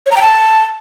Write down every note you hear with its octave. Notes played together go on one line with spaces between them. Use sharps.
C#5
A#5
G5
A5